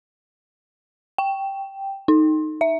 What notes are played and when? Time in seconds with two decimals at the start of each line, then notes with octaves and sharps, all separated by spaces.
1.18 G5
2.08 D#4
2.61 E5